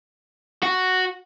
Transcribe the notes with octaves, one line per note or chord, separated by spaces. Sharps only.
F#4